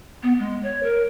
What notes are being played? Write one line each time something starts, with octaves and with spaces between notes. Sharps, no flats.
B3
G#3
C#5
A#4